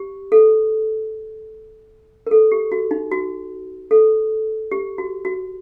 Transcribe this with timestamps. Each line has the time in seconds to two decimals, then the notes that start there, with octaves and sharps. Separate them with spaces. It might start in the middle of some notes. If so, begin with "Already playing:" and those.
Already playing: G4
0.32 A4
2.27 A#4
2.31 A4
2.52 G4
2.72 F#4
2.91 D#4
3.11 F#4
3.91 A4
4.71 G4
4.98 F#4
5.25 F#4